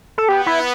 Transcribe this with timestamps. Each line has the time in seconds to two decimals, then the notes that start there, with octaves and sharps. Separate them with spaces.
0.18 A4
0.29 B3 G4
0.46 E4